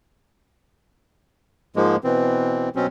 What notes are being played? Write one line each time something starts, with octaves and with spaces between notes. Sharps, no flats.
G#2 F3 G#3 A#3
B2 E3 C4
B2 F#3 C4 C#4